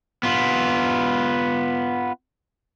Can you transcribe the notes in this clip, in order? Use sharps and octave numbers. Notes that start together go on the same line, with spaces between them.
B3 F4